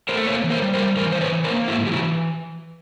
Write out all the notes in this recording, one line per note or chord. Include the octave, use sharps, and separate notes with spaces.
A3 A#4 C5
A#3 B4 C#5
E3
A#4 C5
G3
A#4 C5
G3
E3 A#4 C5
E3 C5
B4 C#5
E3
A#4 C5
A#3
G#2 E4 F#4
E3 G4
E4 F#4